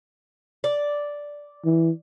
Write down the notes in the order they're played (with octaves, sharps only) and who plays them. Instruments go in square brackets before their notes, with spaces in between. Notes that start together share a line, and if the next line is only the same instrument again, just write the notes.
[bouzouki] D5
[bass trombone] E3